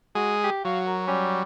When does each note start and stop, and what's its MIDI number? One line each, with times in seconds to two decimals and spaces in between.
0.15 0.50 56
0.15 0.34 66
0.15 0.50 68
0.43 0.61 67
0.65 1.43 54
0.65 0.94 66
0.65 0.81 77
0.86 1.05 70
1.07 1.43 55
1.07 1.41 61